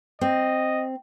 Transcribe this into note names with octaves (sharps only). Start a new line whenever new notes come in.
C4 D#5